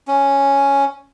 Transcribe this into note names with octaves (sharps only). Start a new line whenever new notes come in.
C#4